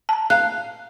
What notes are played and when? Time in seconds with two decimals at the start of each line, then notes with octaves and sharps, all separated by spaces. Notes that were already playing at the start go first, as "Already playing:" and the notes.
0.09 A5 A#5
0.30 F5 F#6